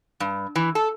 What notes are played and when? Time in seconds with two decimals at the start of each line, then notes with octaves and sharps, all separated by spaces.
0.20 G2
0.56 E3
0.75 A4